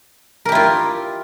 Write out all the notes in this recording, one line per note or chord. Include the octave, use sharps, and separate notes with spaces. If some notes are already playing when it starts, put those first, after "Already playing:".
E4 F4 G4 A#4